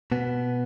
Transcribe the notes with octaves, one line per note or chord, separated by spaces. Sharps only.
B2 B3